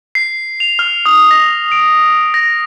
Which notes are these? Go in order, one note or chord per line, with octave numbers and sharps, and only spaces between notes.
C7
F7
F6
D#6
A#6
D7
A#6